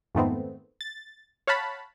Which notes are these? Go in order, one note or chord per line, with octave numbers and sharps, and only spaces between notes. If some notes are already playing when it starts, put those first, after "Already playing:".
F2 G#2 D#3 A3 B3 C4
A6
C#5 F5 F#5 A5 B5